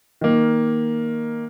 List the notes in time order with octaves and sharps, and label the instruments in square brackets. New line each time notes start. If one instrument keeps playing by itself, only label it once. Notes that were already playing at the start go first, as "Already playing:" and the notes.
[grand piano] D#3 A#3